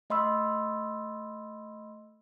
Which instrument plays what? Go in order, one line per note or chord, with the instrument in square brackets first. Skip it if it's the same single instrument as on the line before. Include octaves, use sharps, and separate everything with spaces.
[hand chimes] A3 D#5 B5 C6 E6